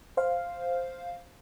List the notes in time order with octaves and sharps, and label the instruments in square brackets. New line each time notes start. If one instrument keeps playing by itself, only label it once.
[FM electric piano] C5 F5